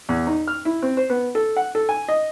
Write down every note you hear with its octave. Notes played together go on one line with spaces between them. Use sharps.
E2
D#4
F6
E4
C4
C5
B3
A4
F#5
A4
G#5
D#5